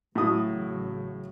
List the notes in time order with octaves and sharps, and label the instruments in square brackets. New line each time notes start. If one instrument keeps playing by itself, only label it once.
[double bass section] A1 C#3 F#3 [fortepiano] A2 F#4 D#6